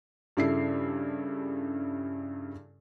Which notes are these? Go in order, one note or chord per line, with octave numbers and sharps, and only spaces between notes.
G2 C#3 E4 A4 C7